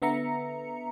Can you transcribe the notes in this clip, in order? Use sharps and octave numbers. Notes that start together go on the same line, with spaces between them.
D3 B3 E5 A#5 C#7